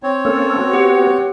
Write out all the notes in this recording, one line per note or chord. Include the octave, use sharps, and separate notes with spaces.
C4 C#5
A#3 C#4 A4
B3 F#4
G4 F#5